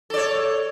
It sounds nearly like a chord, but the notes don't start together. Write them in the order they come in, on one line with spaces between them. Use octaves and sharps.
A4 D5 C#5